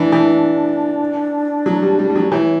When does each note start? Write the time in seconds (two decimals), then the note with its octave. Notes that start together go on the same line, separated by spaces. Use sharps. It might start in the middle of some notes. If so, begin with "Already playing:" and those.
Already playing: E3 D4
0.12 E3
1.66 F#3
1.82 G3
1.99 G3
2.10 G3
2.16 F#3
2.31 E3 C#5